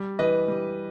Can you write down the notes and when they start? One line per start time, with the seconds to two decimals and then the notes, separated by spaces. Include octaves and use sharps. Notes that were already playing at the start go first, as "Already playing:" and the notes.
Already playing: G3
0.19 E3 B4 D#5
0.48 G3